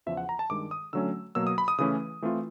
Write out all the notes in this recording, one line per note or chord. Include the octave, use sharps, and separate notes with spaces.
E2 C#3 F3 E5
F#5
A#5
A5
G2 D#3 G#3 D6
D#6
D3 F#3 A3 C#4 E6
B2 F#3 A#3 E6
D#6
B5
D#6
C#3 E3 A3 C#4 E4 D#6
E3 A3 C4 F4